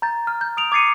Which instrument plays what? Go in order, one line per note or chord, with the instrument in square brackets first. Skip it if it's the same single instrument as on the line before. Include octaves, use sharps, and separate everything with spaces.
[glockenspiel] A#5 G6 A6
F6
G6
D#6 D7 F7
D6 G#6 A6 C7 C#7 D#7